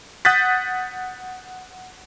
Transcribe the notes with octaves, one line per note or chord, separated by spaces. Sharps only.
F#5 D#6 F#6 G6 A6 B6